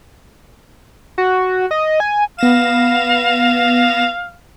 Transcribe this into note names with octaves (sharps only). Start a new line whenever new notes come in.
F#4
D#5
G#5
B3 F5 A#6 E7